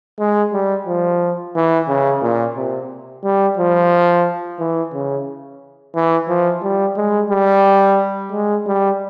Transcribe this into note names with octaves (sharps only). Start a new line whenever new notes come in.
G#3
G3
F3
E3
C#3
A#2
C3
G3
F3
E3
C#3
E3
F3
G3
G#3
G3
G#3
G3